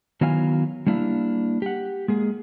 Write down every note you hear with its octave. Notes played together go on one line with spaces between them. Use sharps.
D#3 F#3 B3 E4 F5 G#5
G3 A#3 D4 E4 F5
G4 F#5
G#3 A#3 G#4